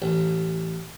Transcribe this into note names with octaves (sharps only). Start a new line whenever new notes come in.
A1